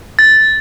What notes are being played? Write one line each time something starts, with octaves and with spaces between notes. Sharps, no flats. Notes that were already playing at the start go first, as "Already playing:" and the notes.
A6